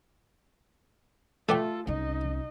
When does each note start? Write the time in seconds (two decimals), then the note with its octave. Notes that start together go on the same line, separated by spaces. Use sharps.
1.49 A3 F4 A4 B4 D5 G5
1.87 C2 C#4 D#4 D#5